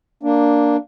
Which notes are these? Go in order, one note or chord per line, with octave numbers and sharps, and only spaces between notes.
A#3 D4